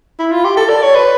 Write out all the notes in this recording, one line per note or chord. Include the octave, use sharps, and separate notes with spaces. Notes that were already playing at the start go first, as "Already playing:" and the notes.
E4
F4
G4
A4
D5
C#5
B4